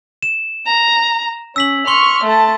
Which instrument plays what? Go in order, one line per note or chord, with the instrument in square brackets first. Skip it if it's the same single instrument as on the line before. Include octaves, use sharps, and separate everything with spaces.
[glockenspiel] E7
[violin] A#5
[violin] C#4 [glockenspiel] E6 B6 F#7
[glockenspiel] C6 G7 [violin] C#6 F6
[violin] A3 A5